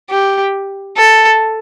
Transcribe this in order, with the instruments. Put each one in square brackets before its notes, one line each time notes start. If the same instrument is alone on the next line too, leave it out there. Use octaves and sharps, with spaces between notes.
[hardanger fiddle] G4
A4